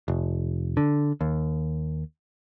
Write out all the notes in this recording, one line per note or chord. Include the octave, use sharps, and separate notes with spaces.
F1
D3
D#2